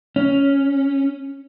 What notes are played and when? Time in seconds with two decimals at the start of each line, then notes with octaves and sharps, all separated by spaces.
0.16 C#4